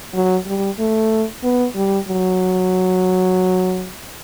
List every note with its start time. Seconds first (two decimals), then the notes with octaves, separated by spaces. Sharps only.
0.14 F#3
0.47 G3
0.79 A3
1.44 B3
1.76 G3
2.08 F#3